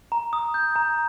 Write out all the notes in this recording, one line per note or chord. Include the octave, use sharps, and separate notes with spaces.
A#5
D#6
G6
A#5